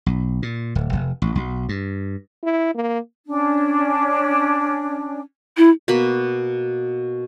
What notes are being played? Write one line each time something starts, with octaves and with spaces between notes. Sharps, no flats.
B1
A#2
D1
F1
A1
B1
G2
E4
A#3
C#4 D4
E4
B2 A#3 B5